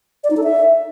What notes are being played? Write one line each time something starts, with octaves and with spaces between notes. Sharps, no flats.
D5
D#4
A4
E5